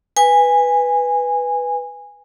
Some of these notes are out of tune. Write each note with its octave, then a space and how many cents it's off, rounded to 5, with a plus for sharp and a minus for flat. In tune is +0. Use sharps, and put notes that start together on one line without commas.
B4 +0 G#5 -15